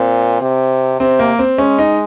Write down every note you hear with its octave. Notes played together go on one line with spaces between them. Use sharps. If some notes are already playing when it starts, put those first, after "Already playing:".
Already playing: A#2 C4
C3
C3 C4
A#3
C4
G#3 C#4
D#4